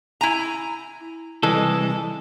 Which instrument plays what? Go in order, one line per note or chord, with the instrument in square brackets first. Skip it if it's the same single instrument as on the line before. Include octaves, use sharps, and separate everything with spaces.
[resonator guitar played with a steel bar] E4 G#5 A#5
[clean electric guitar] C2 E3 A4 [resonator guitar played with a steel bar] G#3